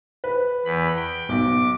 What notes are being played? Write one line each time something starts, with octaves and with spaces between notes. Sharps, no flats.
B4
E2 B5
G5
B1 D6